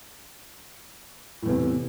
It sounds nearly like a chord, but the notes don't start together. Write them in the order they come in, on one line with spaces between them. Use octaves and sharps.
A2 E2 C3